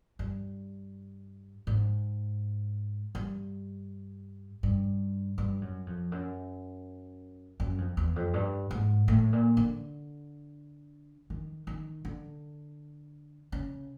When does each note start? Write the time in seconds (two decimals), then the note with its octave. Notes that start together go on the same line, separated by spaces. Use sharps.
0.19 G2
1.67 G#2
3.15 G2
4.63 G2
5.38 G2
5.62 F#2
5.87 F2
6.12 F#2
7.60 F#2
7.78 F2
7.97 E2
8.16 F2
8.34 G2
8.71 G#2
9.08 A2
9.33 A#2
9.57 D3
11.30 D#3
11.67 D#3
12.05 D3
13.52 C#3